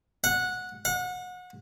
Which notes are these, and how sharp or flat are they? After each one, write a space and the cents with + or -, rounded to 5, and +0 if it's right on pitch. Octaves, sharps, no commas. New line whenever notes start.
F#5 -15
F#5 -30